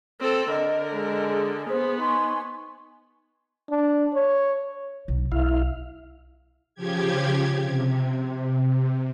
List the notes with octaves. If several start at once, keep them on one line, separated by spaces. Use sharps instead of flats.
C4 A4
D3 A#4 D#5
G#3
G#4
B3 C5
D#4 G#5 C6 C#6
D4
C#5
B1
B1 E4 F5
C#3 F3 G4 G#6
C3